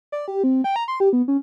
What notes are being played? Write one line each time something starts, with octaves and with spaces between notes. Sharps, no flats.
D5
G4
C4
G5
A#5
C6
G4
B3
C#4